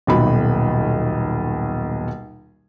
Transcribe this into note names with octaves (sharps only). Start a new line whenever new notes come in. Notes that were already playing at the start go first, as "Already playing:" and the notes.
D#1 B1 B5